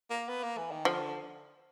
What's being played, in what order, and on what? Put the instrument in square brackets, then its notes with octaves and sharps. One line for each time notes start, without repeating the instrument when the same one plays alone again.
[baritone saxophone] A#3
B3
A#3
E3
D#3
[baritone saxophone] D3 [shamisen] F3